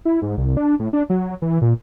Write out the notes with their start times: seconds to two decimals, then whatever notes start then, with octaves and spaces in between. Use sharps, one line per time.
0.05 E4
0.22 G#2
0.37 C2
0.57 D4
0.79 A2
0.93 D4
1.10 F#3
1.42 E3
1.62 A#2